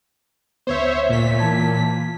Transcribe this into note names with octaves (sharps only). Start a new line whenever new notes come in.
D2 B3 C5 C#5 E5
A#2 B6
E3 A5 G#6